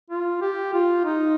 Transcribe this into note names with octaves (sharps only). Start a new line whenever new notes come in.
F4
G4
F4
D#4